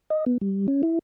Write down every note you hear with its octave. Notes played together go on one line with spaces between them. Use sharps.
D#5
B3
G3
C#4
E4